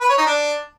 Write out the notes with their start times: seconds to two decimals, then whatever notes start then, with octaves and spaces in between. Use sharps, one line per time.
0.01 B4
0.09 C#5
0.18 D#4
0.26 D4